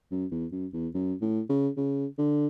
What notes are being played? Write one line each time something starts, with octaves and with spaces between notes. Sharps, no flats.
F#2
E2
F#2
E2
F#2
A2
C#3
C#3
D3